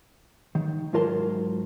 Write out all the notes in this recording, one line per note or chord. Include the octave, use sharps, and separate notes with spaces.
D#3
G#2 F#3 F4 A#4 A5 C6